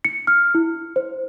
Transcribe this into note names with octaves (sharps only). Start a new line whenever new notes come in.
C#7
F6
E4
C5